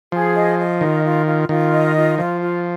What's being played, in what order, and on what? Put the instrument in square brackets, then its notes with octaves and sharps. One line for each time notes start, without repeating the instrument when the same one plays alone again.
[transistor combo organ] F3 [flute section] G#4
[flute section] D#5
D#5
[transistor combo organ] D#3 [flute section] F4
[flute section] F4
F4
[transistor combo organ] D#3 [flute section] F4
[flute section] D#5
F4
[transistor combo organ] F3 [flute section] F4
[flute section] F4